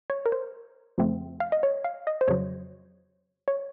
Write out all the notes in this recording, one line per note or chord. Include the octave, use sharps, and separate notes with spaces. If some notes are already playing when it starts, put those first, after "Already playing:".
C#5
A#4
C5
F2 C#3 F3 A3 C4
F5
D#5
C#5
F5
D#5
C5
F2 C#3 F#3 C#5
C#5